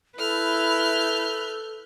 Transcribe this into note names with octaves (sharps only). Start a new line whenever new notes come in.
E4 A4 B4 F6 G6